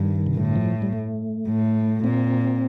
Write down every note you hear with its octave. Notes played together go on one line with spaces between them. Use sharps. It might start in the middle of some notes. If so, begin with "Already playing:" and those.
Already playing: G2 D#3
C3
A2 D3
F3
G3
A3
A2
A#2 C4